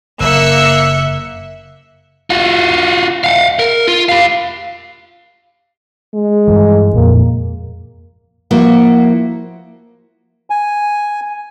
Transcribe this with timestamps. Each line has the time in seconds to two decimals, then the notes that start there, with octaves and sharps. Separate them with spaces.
0.20 F#1 A#3 E5 E6 F#6 C#7
2.30 F4 F#4
3.24 F5 F#5
3.59 A#4
3.88 F4
4.09 G4 F5
6.14 G#3
6.48 G2 E3
6.94 F2 A#2 A#3
8.51 F3 A#3 E4 F#4 E5
10.50 G#5